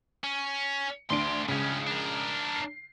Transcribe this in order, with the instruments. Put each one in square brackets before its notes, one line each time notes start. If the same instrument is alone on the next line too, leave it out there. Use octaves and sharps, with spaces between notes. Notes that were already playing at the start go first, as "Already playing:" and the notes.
[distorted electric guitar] C#4
[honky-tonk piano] D2 D4 D7 [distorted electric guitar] A3 C6
[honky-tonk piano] C#2 C#3 [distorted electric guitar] G2 C#4
[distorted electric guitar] D4 A#4
[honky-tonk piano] C7